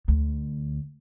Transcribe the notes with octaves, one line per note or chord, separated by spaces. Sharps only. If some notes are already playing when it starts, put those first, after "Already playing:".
D2